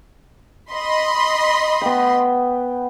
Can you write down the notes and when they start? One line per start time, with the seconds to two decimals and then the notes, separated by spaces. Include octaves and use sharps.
0.71 D#5 B5 C6
1.81 B3 G5